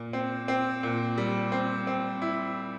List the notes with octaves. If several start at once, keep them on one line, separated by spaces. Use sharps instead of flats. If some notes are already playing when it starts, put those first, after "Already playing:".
Already playing: A#2
C4
C4
A#2
G3
C4
C4
E4